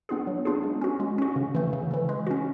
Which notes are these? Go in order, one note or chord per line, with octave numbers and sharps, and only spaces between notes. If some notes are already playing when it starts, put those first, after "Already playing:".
B3 D4 F4 G#4
F#3
B3 D4 F4 G#4
G#3
C#4 F#4
G#3
C#4 F#4
C#3
E3 A3
C#3
E3 A3
G#3
C#4 F#4